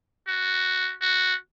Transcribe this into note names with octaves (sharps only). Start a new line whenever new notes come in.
F#4
F#4